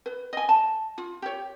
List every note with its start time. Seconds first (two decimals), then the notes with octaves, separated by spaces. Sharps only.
0.06 B4
0.33 D#5 G#5
0.49 A5
0.98 F4
1.22 G4 C#5